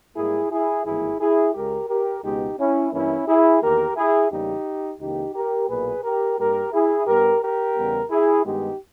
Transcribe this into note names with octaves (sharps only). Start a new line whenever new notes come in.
G#2 G3 A#3 E4 G#4
E4 G#4
G#1 G2 E3 A#3 E4 G#4
E4 G#4
C#2 C#3 G#3 G4 A#4
G4 A#4
C#2 B2 G#3 B3 D#4 G4
C#4 E4
G2 E3 A#3 C#4 E4
E4 G#4
E2 D#3 A#3 G4 A#4
E4 G#4
E2 C#3 G3 A#3 D#4 G4
C#2 C#3 E3 A#3 D#4 G4
G4 A#4
B1 A#2 A#3 G#4 B4
G4 A#4
G2 G3 A#3 G4 A#4
E4 G#4
G2 G3 B3 G4 A#4
G4 A#4
E2 C#3 G3 B3
E4 G#4
G2 D#3 G#3 B3 D#4 G4